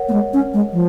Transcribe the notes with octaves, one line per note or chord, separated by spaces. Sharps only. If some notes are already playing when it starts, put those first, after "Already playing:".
Already playing: A#4 C#5 F#5
A#3
G#3
C#4
G#3
F3